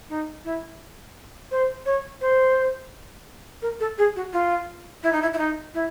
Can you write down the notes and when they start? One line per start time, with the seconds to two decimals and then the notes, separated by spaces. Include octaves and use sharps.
0.10 D#4
0.45 E4
1.51 C5
1.86 C#5
2.21 C5
3.62 A#4
3.80 A4
3.98 G#4
4.16 F#4
4.33 F4
5.03 E4
5.13 D#4
5.22 E4
5.33 E4
5.38 D#4
5.74 E4